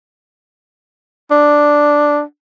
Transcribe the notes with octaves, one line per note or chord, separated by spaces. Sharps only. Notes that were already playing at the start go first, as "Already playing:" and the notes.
D4